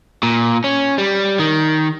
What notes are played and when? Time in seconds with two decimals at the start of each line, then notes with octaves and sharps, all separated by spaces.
0.23 A#2
0.64 C#4
0.98 G3
1.39 D#3